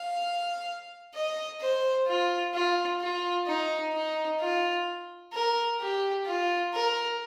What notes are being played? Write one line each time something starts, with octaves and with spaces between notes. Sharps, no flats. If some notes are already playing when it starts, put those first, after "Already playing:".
Already playing: F5
D#5
C5
F4
F4
F4
D#4
D#4
F4
A#4
G4
F4
A#4